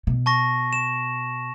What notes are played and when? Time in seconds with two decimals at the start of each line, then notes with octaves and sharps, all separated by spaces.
0.07 B2
0.26 A5 C#6 A#6
0.73 E7